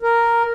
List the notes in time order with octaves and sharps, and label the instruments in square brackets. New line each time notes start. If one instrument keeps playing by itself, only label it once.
[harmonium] A#4